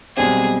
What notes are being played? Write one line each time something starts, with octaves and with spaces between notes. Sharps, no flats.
B1 B2 G3 C4 G#4